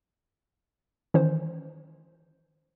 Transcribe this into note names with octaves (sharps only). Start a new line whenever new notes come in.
D#3 E3 C#4 C5